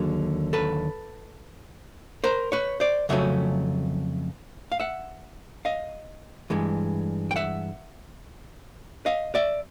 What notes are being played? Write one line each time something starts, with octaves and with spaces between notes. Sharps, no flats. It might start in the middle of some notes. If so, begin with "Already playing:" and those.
Already playing: D#2 D3 F#3 G#4
A4 B4
A#4 C5
B4 C#5
C5 D5
F2 C#3 F#3 A3 C#4 E5
F5
E5 F#5
D#5 F5
G2 E3 G#3
G5
E5 F#5
D#5 F5
D5 E5